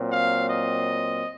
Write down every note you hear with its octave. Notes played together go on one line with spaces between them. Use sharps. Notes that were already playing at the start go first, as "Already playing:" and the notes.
Already playing: A#2 F#3 C4
F5
D#5